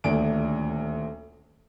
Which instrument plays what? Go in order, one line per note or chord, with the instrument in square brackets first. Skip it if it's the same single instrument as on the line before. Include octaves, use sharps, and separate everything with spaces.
[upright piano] D#1 D2 D4 D7